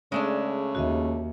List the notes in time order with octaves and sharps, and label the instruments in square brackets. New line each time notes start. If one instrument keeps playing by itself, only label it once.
[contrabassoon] C#3 [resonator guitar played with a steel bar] G#3 A3 D4
[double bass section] D#2 [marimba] F#4 D#5 E5